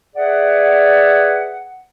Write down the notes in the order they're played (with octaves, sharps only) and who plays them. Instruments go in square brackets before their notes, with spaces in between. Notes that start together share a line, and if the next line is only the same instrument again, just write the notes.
[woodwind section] G#4 B4 D5 E5 F#5